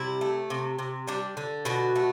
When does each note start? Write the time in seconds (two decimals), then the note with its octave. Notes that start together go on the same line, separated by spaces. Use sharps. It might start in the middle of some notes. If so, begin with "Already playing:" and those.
Already playing: C3 G3 E4
0.21 A3
0.50 C3
0.79 C3
1.08 G3 D4
1.37 D3
1.65 B2 F#4
1.96 A3